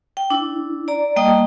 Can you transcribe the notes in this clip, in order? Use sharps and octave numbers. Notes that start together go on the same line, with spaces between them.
G5
D4 E4
D5 A#5
G3 A#3 D#5 G5 A5 D#6